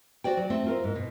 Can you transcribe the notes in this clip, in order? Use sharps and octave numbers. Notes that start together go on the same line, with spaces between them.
F#4 C5 D5 G5
F#3
A3 C4
F4 A#4 C5
G#2
B2